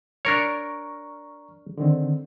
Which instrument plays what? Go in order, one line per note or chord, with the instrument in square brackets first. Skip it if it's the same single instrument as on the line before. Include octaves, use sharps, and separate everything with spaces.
[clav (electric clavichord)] D4 A#4 C#5 [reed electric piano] A#5 C#6 F6
[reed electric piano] D3 D#3 C4